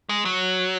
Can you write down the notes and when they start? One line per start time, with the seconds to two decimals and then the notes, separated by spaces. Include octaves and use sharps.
0.09 G#3
0.25 F#3